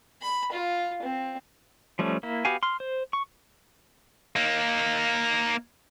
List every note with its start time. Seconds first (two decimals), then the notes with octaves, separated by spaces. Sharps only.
0.22 B5
0.52 F4
1.02 C4
1.99 F3 G3 A3 C#4
2.23 A#3 E4
2.45 B3 F#4 G4 F5 G#5
2.63 C6 F6
2.80 C5
3.13 C#6
4.36 A#3 D#4